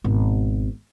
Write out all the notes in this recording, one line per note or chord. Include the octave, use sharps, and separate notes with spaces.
G#1 B2